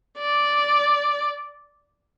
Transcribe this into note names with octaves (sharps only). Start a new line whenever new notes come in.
D5